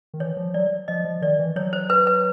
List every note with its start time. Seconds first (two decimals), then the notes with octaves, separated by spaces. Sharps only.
0.14 D#3
0.20 E3 C#5
0.37 F3
0.54 F#3 D5
0.88 F3 D#5
1.05 F3
1.22 D#3 D5
1.39 E3
1.56 F#3 C#5
1.73 C5
1.90 B4
2.07 B4